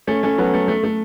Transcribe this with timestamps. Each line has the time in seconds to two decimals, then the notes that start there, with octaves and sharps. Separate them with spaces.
0.07 A3 C#4
0.23 A3 C#4
0.38 F#3 B3
0.54 A3
0.68 A3
0.84 A3